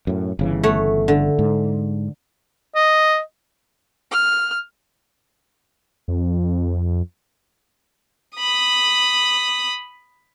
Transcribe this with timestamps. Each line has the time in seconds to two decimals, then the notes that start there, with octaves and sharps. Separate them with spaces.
0.07 F#2 A2
0.39 G1 C#3 E3
0.63 A3 C#5 F#5
1.08 D3
1.39 G#2
2.76 D#5
4.11 F6
6.08 F2
8.39 B5 D#6